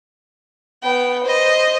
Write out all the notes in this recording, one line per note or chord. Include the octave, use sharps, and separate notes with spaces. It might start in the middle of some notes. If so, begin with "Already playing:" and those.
B3 G5
C5 D#5